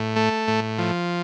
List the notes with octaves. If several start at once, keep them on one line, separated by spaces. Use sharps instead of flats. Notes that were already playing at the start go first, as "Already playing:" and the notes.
Already playing: A2
A3
A2
F3